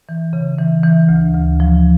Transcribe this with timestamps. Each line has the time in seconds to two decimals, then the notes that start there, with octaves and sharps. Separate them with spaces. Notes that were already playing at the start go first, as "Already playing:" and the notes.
0.09 E3
0.33 C#3
0.58 E3
0.83 E3
1.09 D2
1.34 D2
1.60 F3